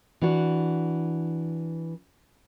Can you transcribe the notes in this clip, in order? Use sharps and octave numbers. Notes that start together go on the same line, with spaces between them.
E3 D4 F#4